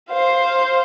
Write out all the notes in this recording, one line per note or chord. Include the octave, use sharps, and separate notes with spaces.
C5 F5